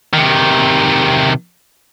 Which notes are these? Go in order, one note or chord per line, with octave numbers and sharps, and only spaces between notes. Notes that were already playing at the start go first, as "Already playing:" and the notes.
C3 D#3